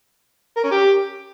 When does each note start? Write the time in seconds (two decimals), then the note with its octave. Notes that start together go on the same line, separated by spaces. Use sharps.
0.57 A#4
0.64 C#4
0.71 G4